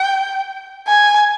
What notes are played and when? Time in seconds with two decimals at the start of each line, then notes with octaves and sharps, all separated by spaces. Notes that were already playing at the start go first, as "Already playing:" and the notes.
Already playing: G5
0.88 G#5